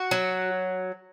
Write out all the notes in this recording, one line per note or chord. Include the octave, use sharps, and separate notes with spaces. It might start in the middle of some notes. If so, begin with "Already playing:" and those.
Already playing: F#4
F#3